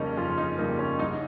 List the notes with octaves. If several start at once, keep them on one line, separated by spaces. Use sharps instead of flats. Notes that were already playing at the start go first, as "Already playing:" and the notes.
Already playing: F2 C#3 G3 A#3 C#4 D#4 A#4
F2 F4
D#4
C#3 G3 A#3 D#4
C#4
C2 D#4